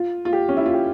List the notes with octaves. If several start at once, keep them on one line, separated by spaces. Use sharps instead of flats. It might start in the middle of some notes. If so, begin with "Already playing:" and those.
Already playing: F4
F4
G4
C#4
E4
F4
G4